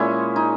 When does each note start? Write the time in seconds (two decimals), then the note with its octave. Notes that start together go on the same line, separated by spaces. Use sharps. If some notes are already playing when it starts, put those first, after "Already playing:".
Already playing: A#2 G#3 C#4 E4
0.36 D#4